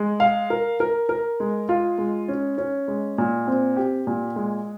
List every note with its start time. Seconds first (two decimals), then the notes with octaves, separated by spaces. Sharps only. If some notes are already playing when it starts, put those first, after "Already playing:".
Already playing: G#3
0.20 F5
0.50 A#4
0.80 A#4
1.09 A#4
1.40 G#3
1.69 F4
1.98 G#3
2.28 C#4
2.58 C#4
2.88 G#3
3.18 A#2
3.47 C4
3.76 G4
4.07 A#2
4.36 G#3